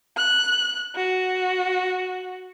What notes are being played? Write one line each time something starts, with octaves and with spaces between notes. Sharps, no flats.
F#6
F#4